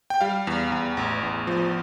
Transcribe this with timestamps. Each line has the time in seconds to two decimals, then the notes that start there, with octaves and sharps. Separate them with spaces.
0.10 G5
0.21 G3 F5
0.47 E2
0.72 E2
0.97 A1
1.23 A1
1.47 F3